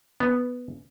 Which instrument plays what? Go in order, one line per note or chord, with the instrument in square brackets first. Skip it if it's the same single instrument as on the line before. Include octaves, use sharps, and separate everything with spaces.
[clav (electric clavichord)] B3